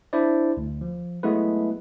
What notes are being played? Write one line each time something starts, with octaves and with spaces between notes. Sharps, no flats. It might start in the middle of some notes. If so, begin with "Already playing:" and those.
D4 E4 C5 D5
D2
F3
F#3 G#3 A3 B3 E4 B4